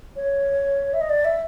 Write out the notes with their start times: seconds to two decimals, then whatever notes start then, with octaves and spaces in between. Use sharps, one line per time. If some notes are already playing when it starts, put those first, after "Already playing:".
0.16 C#5
0.93 E5
1.01 D#5
1.09 D5
1.25 E5